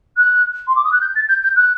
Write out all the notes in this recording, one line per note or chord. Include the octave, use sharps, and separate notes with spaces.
F#6
C6
D6
D#6
F#6
G6
A6
G6
G6
F#6